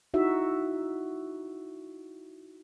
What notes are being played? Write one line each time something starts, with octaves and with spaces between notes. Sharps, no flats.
D#4 E4 F#4 E5